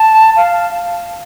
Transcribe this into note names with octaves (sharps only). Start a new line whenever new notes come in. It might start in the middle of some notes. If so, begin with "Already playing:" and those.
Already playing: A5
F5